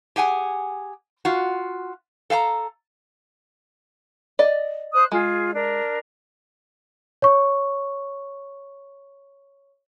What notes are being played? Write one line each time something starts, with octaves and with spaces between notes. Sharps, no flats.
G4 G#4 F#5 G#5
F4 F#4
A4 F5 G#5 A#5
D5 D#5
C5 D#6 F#6
G#3 F4 G#4
D4 A#4
C#5 C#6